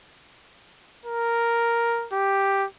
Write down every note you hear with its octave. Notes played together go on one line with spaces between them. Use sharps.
A#4
G4